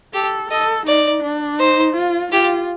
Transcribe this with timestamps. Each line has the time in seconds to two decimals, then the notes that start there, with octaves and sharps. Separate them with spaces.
0.14 G4 A4
0.51 A4 D#5
0.86 D#4 D5
1.23 D4
1.59 D#4 C5
1.96 F4
2.32 F4 G4